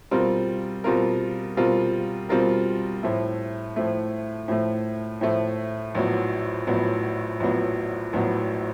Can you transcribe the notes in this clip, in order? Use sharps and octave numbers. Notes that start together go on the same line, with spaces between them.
B2 G3 C4 F4 A#4
B2 G3 C4 F4 A#4
B2 G3 C4 F4 A#4
B2 G3 C4 F4 A#4
A2 F3 A3
A2 F3 A3
A2 F3 A3
A2 F3 A3
A#1 A2 F#3 B3
A#1 A2 F#3 B3
A#1 A2 F#3 B3
A#1 A2 F#3 B3